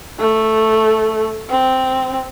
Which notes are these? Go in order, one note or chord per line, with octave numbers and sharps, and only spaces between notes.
A3
C4